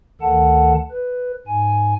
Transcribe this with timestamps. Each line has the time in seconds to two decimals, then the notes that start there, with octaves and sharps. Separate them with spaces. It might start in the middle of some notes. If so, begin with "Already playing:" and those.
0.21 D2 D#3 A4 F#5 A5
0.91 B4
1.47 G#2 G#5